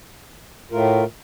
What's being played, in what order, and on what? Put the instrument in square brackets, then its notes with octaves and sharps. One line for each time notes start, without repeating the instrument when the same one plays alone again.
[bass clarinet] A2 [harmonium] A3 F4 A#4